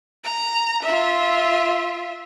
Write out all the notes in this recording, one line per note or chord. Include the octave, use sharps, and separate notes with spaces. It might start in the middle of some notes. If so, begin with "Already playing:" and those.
A#5
F4 E5